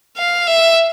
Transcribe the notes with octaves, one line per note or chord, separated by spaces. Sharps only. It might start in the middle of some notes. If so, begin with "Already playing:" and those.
F5
E5